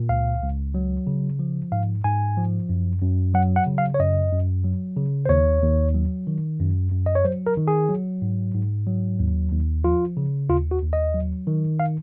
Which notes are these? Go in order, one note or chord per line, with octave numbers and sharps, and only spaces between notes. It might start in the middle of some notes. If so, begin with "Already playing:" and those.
Already playing: A#2
C#2 F5
C#2
F#3
C#3
F3
G#2 F5
G#2 G#5
F3
F#2
F#2
F#3 F#5
F#5
C#3
F5
C#5
F#2 D#5
F#2
F#3
C#3
C5
D#2 C#5
D#2
F#3
D#3
F#2
F#2
D#5
C#5
F#3 C5
A#4
D#3
G#4
F#3
G#2
G#2
F#3
D#2
D#2
F3 F4
C#3
D#2 F4
F#4
D#2
D#5
F#3
D#3
F5